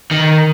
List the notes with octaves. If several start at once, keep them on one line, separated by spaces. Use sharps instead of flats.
D#3